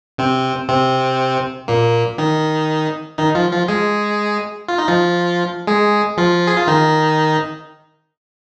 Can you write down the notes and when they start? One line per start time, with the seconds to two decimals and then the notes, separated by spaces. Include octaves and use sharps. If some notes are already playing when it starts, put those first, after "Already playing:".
0.18 C3 C4
0.69 C3 C4
1.68 A#2 A#3
2.18 D#3 D#4
3.18 D#3 D#4
3.35 F3 F4
3.51 F3 F4
3.68 G#3 G#4
4.68 F4
4.78 D#4
4.88 F3 F4
5.67 G#3 G#4
6.17 F3 F4
6.47 G#4
6.58 F4
6.68 D#3 D#4